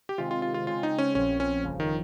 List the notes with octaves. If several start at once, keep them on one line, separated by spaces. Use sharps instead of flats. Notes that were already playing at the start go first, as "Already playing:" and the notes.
G4
C3 D#3 G#3 C4 F4
F4
F4
F4
C#3 G#3 C4 F4
D#4
C#4
A#1 A#2 F3 C4 C#4
C#4
G1 F2 C#3 F3
D#3